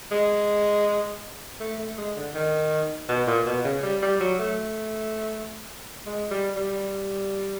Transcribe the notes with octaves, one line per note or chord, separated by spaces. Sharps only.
G#3
A3
A3
G#3
D3
D#3
B2
A#2
B2
C#3
G3
G3
F#3
A3
G#3
G3
G3